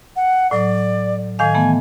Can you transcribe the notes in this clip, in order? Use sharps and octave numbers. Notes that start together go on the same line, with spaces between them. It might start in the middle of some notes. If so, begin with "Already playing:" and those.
F#5
A2 F#3 D5
A2 D#3 F5 G#5
E3 A3 B3